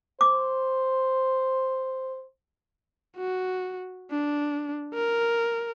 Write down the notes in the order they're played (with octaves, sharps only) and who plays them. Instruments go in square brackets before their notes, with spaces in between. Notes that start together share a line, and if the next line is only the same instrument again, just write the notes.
[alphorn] C5 [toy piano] D6
[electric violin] F#4
D4
A#4